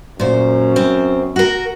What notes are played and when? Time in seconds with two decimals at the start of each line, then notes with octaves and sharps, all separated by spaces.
0.20 F#2 A#2 C5
0.76 C4
1.36 F#4 A#4